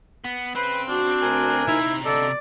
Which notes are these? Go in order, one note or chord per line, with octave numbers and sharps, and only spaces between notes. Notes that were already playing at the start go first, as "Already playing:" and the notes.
B3
C#3 C4 B4 C5
D4 F#4
D2 A#4 G#5
C3 D#4 E4 A#5
D3 A4 D5 D#5